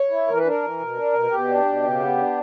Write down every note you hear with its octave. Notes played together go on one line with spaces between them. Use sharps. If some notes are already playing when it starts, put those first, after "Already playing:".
Already playing: C#5
E4
E3 A#4
B4
D4 A#4
E3
B2
D4
B2
B2 G4
D4
B2
C#3
B3
D4